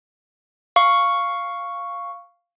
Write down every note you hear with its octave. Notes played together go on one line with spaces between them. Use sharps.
F5 C#6